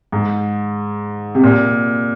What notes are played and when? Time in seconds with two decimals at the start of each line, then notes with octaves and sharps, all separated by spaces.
0.12 G#2
1.35 C3
1.43 A#2